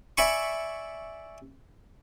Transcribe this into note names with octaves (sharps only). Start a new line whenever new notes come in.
D5 E5 G#5 B5 C#6